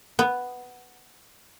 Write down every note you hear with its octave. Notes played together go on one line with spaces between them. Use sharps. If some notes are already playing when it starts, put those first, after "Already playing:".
B3